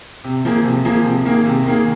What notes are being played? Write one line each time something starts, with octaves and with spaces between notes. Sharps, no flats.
C3
F3 A#3 G#4
C3
F3 A#3 G#4
C3
D#3 A#3 G#4
C3
D#3 A#3 G#4